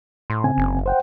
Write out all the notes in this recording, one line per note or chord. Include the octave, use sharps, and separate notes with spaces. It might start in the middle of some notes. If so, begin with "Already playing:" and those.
A2 C6
C#3 C4 G#5
F#1
C5 F#5 G5